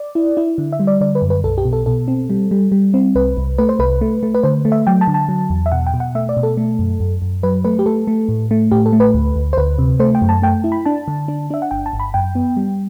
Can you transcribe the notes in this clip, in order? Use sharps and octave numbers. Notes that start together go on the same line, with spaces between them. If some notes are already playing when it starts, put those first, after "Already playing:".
Already playing: D5
E4
E4
D3
E5
G3
D5
D3 D5
B4
F#2
B4
B1 A4
G4
B2
A4
B2 A4
C4
G3
G3
G3
C4
C2 B4
C2
A3 B4
C5
C2 B4
A3
A3
B4
D3 C5
A3
E5
F#3 G5
A5
D3
A5
F#3
E2
E5
B2 F#5
G5
B2
F#5
A3 E5
D5
B2
A4
A3
F#2
F#2
F#2
F#3 B4
A3 B4
G4
A3 A4
A3
A2
A3
A2 G4
A4
A3
B4
D2
D2
C5
D2 B4
C3
A3 C5
G5
F#2
A5
A3 G5
E4
B5
D4 A5
D3
D4
D4 E5
F#5
G1 G5
A5
G1
B5
F#2 G5
B3
G3